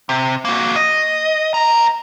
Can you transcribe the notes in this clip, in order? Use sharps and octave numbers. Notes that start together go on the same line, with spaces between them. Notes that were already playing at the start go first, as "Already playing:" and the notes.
C3
A#3 F#4
D#5
B3 A#5